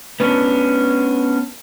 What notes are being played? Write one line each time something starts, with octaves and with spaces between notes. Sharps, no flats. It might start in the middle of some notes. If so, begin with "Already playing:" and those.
B3 C#4 D4